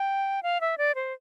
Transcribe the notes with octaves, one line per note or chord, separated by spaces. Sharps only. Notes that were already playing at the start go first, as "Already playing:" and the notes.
Already playing: G5
F5
E5
D5
C5